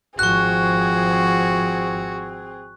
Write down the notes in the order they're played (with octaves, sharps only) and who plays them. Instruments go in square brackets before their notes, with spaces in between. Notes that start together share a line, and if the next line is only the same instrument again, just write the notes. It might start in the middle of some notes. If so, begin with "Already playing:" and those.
[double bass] G#1 F3 [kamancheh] C4 G#4 [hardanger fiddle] F#4 [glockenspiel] C#6 F#6